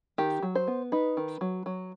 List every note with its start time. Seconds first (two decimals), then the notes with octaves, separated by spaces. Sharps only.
0.18 D#3 G4
0.43 F#3
0.55 C5
0.67 B3
0.92 D#4 B4
1.17 D#3
1.41 F#3
1.66 F#3